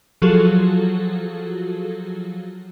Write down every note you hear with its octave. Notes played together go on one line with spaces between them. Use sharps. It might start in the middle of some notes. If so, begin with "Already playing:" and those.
F3 F#3 F4 F#4 G#4 A4